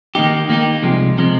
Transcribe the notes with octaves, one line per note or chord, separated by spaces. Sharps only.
D#3 A#3 D#4 G4
D#3 A#3 D#4 G4
C2 C3 F3 G#3
C3 F3 G#3